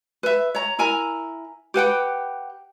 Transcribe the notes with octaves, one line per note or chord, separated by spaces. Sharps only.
B4 E5
C#5 A#5
E4 A#4 G#5 A#5
G4 B4 F#5 G5